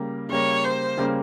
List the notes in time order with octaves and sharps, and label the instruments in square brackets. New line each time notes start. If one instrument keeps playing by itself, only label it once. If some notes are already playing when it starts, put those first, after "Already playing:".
Already playing: [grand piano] C#3 G3 A#3
[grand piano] C#3 G3 A#3 [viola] C#5
[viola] C5
[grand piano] C#3 G3 A#3